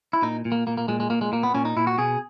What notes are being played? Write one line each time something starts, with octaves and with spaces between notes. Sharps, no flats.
E4
A#2 D#4
A#2
A#3
A#2 A#3
A#3
A#2 G#3
G#3
A#2 A#3
G#3
A#2 A#3
B3
A#2 C#4
D#4
A#2 E4
F#4
B2 G#4